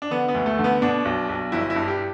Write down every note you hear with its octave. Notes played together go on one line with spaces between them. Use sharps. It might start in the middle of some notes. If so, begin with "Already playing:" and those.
D4
D3 B3
B3
D2
A3
D3
B3
B2 D4
B1
B1
G1 E4
E4
G2
G4